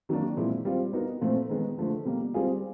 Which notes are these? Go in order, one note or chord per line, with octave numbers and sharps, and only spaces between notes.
D#3 F#3 A#3 D4
A#2 F3 G#3 C4 E4
G3 C4 F4
B3 D#4 F#4 A#4
A#2 F3 A3 C4
D#3 G#3 B3
D3 F3 A3
B2 G3 A#3
G3 C4 F4 G#4